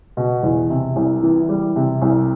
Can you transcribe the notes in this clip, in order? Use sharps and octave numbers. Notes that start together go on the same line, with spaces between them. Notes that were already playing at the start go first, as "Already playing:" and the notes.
B2
E2
C3
C2
E3
G3
C3
C2